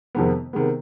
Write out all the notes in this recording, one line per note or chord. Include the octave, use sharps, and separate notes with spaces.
F2 C3 D#3 G#3 B3
C3 D#3 G#3 B3